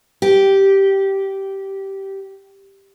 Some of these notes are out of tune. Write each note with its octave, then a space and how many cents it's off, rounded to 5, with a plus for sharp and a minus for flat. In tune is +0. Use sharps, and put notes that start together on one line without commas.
G4 -10